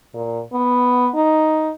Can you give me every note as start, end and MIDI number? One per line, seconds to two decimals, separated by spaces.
0.14 0.41 46
0.52 1.09 59
1.15 1.72 63